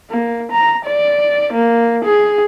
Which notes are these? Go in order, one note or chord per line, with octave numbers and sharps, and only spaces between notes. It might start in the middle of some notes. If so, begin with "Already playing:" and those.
A#3
A#5
D5
A#3
G#4